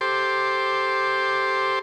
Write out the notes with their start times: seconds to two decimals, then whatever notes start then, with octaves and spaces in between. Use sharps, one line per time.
0.01 G4 A4 C5 C6 D6